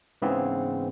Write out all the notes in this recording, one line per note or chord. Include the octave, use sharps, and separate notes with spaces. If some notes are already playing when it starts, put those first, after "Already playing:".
G#2 C#3 E3 B3 C4